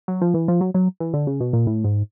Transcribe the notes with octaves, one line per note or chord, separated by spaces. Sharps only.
F#3
F3
E3
F3
F#3
F#3
E3
D3
C#3
B2
A#2
A2
G#2